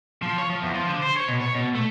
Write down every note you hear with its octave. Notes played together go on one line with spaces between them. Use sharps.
F3
C#5
F3
E2
F3
D3
C5
C#5
B2
C#5
B2
A3